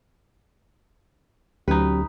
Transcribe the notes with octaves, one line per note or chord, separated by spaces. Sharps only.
D2 F#3 C#4 D#4 G4 B4